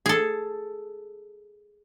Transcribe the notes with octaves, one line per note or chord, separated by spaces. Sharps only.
G#4 A4